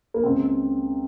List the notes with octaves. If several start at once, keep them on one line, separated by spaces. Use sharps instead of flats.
A#3
C#2 C4